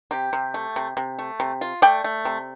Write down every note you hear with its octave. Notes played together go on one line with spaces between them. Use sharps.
C3 G4
C3
A3
C3
C3
A3
C3
F4
A3 D5 G5
A3
C3